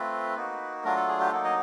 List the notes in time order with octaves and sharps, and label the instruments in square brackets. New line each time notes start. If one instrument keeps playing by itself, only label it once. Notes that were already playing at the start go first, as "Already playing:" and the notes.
Already playing: [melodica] A3 C4 F4 B4
A#3 D#4 F#4
F#3 A3 D4 F4 A#4
A4
G#4
G4
F#3 A#3 D#4 A4
D#5